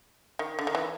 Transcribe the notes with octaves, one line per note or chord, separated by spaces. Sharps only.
D#3
D3
D#3
E3